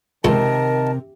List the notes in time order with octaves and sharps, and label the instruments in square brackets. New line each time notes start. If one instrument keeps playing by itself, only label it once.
[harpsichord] C#2 [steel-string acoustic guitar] C3 [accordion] D#3 A5 [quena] A#4